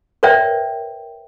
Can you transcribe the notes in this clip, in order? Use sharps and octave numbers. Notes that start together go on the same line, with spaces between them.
A#4 B4 C#5 D5 E5 G5